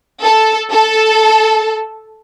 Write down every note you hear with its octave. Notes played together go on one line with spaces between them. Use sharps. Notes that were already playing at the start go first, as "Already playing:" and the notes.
A4
A4